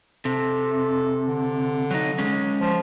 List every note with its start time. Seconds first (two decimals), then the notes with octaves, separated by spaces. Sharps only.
0.25 C3 A4
1.28 D3
1.91 F#3 D#4
2.18 G#3 C#4
2.61 F3